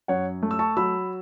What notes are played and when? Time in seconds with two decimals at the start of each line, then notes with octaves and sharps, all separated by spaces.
0.08 F#2 C#5 F#5
0.43 A3
0.51 E6
0.59 A5 C#6
0.77 F#3 B5 E6